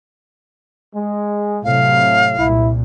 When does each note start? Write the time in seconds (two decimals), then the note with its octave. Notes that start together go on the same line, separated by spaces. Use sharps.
0.95 G#3
1.64 A2 C3 F#3 F5
2.38 C2 A#2 E4